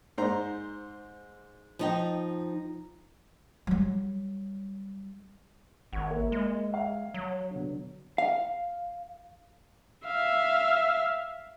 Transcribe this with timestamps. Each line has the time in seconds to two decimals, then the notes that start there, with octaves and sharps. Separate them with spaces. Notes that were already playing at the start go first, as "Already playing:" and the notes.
0.18 G#2 C5 A#5
1.79 F3 D#4 G5
3.67 F#3 G3
5.93 G#1 F#5 C#6 G#6
6.10 A#3 E5
6.32 G#3
6.70 E5 F5
7.14 F#3
7.51 B2 D3
8.18 F5
10.06 E5 F5